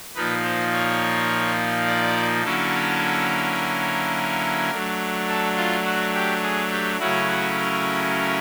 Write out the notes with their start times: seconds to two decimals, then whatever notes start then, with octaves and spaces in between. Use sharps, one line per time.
0.15 A#2 F3 A#3 D#4 B4
0.44 C5
0.72 C#5
1.87 D5
2.43 D3 F#3 A#3 C#4 E4 A4
3.58 A#4
4.72 F#3 A3 D4
5.28 A4
5.56 F4
5.85 F#4
6.14 G4
6.43 G#4
6.71 G4
6.99 C#3 F#3 A3 C#4 E4 F#4
7.27 F#4
7.56 A#4